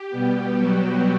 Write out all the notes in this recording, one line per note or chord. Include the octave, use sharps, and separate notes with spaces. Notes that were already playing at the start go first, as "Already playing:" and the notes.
Already playing: G4
B2 G3 B3
F#3 F#4